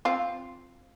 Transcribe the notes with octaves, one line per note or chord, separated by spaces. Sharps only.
C4 F4